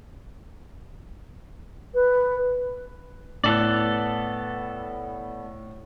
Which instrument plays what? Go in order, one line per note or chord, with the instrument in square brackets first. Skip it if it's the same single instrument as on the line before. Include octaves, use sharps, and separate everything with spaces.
[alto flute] B4
[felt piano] A2 [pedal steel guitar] B3 A4 D5